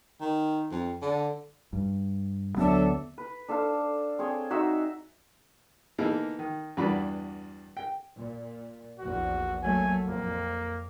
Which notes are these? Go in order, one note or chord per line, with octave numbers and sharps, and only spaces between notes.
D#3
F2
D3
G2
D2 F#3 B3 D4 A4 E5
B4
D4 A4 C5 F5
C4 G#4 C#5 G5
D#4 F#4 C5 E5
E3 A#3 B3 D#4 A4 A#4
D#3
E2 G2 E3 D4 F#4 B5
G5
A#2
A#1 E2 F#4
F#3 A3 A#3 G#5
F2 A#2 A#3